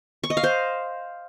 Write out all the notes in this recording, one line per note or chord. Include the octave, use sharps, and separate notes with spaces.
C#6
D#5
F5
C5